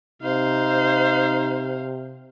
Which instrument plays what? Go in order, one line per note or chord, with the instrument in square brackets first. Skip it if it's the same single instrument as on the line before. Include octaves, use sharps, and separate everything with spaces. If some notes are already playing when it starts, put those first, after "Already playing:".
[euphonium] C3 [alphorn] D#4 [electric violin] C5 F5